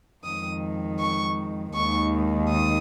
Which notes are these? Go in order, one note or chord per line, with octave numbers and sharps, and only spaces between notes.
F2 D#3 G#3 D#6
C#6
D#2 D#3 G#3 C#6
D#6